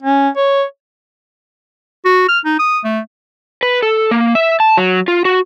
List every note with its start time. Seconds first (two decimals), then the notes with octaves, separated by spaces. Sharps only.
0.03 C#4
0.37 C#5
2.05 F#4
2.29 F6
2.45 D#4
2.59 D#6
2.84 A3
3.63 B4
3.83 A4
4.11 A#3
4.35 E5
4.60 A5
4.77 F#3
5.08 F4
5.25 F#4